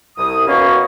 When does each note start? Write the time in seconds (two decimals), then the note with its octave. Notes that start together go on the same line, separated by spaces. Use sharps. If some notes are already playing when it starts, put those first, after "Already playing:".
0.18 C2 D#6
0.48 B2 A#3 C#4